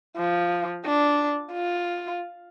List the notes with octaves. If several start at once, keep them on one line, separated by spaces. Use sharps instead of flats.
F3
D4
F4